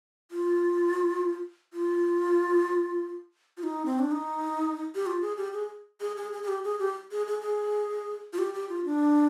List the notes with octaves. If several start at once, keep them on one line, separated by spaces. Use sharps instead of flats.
F4
F4
F4
D#4
C4
D4
D#4
G4
F4
G#4
G4
G#4
G#4
G#4
G#4
G#4
G4
G#4
G4
G#4
G#4
G#4
F4
G4
G4
F4
D4